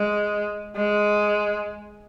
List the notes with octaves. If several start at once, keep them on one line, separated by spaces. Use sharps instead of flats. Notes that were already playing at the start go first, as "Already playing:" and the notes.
Already playing: G#3
G#3